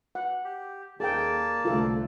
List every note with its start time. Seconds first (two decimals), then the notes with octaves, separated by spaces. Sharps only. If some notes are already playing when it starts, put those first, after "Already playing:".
0.15 F#5
0.44 G4
1.00 D#2 A#3 G#4 A4 D5 G5 A5
1.65 C2 D3 A3 F4 A4